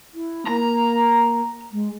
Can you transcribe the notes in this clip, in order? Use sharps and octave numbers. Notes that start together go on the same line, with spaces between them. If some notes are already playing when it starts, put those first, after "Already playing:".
E4
A#3 A#5
G#3